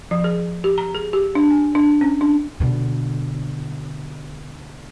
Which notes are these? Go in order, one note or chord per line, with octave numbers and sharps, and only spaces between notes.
F3
G#4
G4
A#5
G#4
G4
D4
G#5
D4
C#4
D4
B2 D3